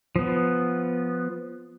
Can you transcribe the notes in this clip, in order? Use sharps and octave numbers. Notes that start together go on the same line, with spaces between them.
F3 B3